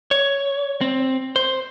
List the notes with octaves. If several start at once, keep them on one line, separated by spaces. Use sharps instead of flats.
C#5
C4
C5